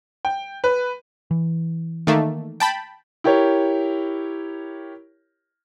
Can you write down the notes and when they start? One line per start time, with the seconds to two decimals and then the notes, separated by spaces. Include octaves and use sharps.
0.25 G5
0.64 B4
1.31 E3
2.07 D#3 A3 A#3
2.60 G5 A5 B5
3.24 E4 G4 A#4 C#5